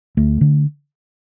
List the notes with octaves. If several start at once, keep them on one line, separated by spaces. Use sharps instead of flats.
D2 A3
D3